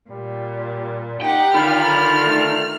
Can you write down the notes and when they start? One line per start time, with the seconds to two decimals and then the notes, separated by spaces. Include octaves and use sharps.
0.11 A#2 G3
1.21 D#4 G4 F#5 G5
1.54 D3 D#3 D#4 F4 A4 B5 F6
2.25 A3